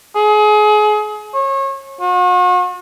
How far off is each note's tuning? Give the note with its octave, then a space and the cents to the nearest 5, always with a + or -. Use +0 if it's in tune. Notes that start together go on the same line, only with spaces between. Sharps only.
G#4 +30
C#5 -30
F#4 -40